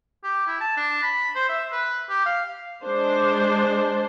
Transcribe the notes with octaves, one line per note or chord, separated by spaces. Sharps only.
G4
E4
A5
D4
B5
C5
E5
B4
G4
F5
G#3 D4 C5